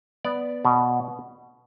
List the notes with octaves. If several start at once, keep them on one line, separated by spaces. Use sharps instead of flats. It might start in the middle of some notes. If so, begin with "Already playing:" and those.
B3 D5
B2